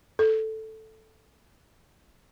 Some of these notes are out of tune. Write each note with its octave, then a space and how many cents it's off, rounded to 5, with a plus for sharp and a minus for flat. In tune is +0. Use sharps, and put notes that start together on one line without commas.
A4 +0